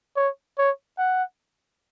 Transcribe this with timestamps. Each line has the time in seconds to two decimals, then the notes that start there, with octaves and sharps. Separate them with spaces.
0.16 C#5
0.58 C#5
0.98 F#5